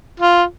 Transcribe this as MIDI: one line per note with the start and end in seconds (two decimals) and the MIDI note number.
0.20 0.43 65